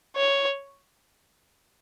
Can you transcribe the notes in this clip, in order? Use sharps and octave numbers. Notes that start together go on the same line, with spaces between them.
C#5